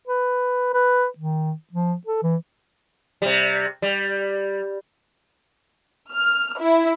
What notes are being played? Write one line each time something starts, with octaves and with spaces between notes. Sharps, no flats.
B4
B4
D#3
F3
A4
E3
C3 G3
G3
F6
E4